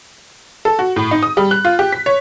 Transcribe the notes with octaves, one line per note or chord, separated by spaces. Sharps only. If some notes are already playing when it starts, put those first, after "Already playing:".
A4
F#4
A2
D#4
D#6
G3
F#6
F4
G4
B6
C#5